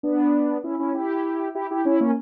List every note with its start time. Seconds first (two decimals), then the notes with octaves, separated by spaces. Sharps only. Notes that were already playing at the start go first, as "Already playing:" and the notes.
0.03 B3 D4
0.64 C#4 E4
0.79 C#4 E4
0.94 E4 G4
1.55 E4 G4
1.71 E4 G4
1.85 C#4 E4
2.01 A#3 C#4